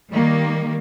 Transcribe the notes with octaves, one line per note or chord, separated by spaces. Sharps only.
D#3 G3 A#3